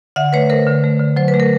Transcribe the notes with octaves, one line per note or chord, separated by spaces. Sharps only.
D3 E5 F#5
A3 B4 C#5
A3 A#4 C5
D3
A3
D3
F#3 C5
B4
A3
A#4